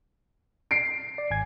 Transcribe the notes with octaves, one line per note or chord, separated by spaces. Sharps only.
C7 D7
D5
G#1 G#5 G#6